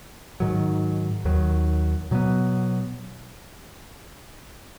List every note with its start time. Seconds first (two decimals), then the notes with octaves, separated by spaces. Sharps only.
0.40 G#2 D#3 F#3
1.25 D#2 D#3 F#3
2.11 B2 F#3 B3